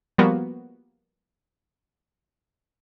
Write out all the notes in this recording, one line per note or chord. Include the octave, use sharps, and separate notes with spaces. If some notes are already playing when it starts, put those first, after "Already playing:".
F3 G3 A#3 B3 F#4